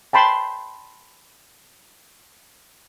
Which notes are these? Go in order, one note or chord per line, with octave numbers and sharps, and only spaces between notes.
G5 A5 B5 C6